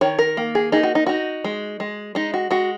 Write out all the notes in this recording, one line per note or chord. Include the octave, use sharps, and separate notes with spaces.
D#3 C#5
A#4
A#3
G#4
D#4 G#4
F#4
D#4
D#4 F#4
G#3
G#3
G#3 D#4
F#4
G#3 F#4